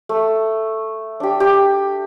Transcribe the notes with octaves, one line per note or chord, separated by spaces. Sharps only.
A3
D4 G4
G4